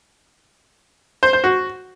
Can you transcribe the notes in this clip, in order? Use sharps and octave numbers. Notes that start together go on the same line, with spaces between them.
C5
C5
F#4